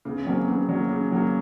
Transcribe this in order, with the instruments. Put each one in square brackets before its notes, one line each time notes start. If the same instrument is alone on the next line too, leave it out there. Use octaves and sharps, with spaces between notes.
[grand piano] C#3 [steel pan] B3
[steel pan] C#4
[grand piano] F#3 A#3 [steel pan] C4
[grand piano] C#3 [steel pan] B3
[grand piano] F#3 A#3
C#3
F#3 A#3